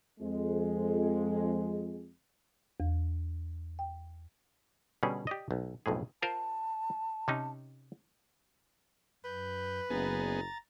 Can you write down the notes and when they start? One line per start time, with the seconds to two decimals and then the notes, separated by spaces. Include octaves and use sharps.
0.20 F2 G#3
2.80 E2
3.79 G5
5.03 B2 D3 G3 C#4 G#4
5.27 G4 D5 D#5
5.51 B1
5.86 B1 F2 A2 G#4
6.22 F4 A#4 C5 A5
7.28 C3 C#4 D#4
9.25 F#2 B4 G6
9.90 F#1 B3 G#4 A#5 A6